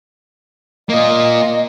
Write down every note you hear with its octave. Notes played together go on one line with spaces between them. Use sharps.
A#3 F4 D#5